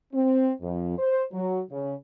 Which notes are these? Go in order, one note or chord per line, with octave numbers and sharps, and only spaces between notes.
C4
F2
C5
F#3
C#3